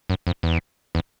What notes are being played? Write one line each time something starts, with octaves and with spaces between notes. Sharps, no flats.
F#2
F2
E2
E2